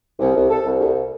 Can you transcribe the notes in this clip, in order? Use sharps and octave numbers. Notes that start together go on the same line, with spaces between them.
C2
C2
C2 A4
C2
D2